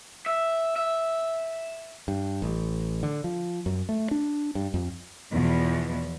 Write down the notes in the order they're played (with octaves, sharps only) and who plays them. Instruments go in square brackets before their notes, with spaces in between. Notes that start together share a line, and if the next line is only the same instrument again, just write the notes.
[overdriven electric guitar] E5
E5
[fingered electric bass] G2
A1
D3
F3
F#2
A3
D4
G2
F2
[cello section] E2 B2 F3